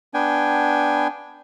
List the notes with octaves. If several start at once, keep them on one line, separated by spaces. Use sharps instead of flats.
B3 D4 G5 G#5